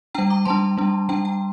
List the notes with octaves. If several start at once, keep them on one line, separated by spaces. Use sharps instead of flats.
G3 D4 G5 A#5
A#5 D6
G3 D4 A5 C6
G3 D4
G3 D4 G5 A#5
G5